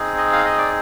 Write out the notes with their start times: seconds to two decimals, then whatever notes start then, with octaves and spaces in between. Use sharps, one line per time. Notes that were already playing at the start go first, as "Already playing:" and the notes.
Already playing: C4 D#4 G#4
0.18 D#5
0.33 F5
0.45 D#5
0.58 D5